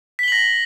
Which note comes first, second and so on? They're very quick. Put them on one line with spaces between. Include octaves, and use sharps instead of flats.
B6 G7 F#7 A#6